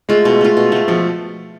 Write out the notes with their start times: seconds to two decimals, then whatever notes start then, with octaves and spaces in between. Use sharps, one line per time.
0.09 G#3 A3 F4
0.25 B2
0.41 A3 F4
0.57 B2
0.72 A3 F4
0.88 B2 F3